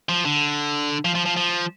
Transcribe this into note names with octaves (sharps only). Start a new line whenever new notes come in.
F3
D3
F3
F3
F3
F3